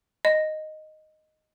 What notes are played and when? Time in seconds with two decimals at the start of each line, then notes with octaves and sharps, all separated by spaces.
0.25 D#5